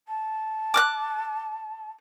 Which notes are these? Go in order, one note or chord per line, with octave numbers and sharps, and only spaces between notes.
A5
D6 F6 F#6